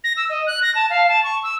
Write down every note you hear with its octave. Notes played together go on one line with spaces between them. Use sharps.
A#6
E6
D#5
F#6
A#6
A5
F5
A5
C#6
E6